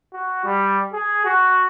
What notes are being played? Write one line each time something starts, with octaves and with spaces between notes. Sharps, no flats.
F#4
G3
G#4
F#4